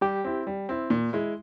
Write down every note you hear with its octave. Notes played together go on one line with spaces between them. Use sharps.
G3 G4
C4 E4
G3
C4 E4
A#2
G#3 E4